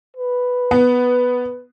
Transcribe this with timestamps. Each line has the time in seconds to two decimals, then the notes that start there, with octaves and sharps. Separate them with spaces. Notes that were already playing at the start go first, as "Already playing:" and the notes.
0.16 B4
0.71 B3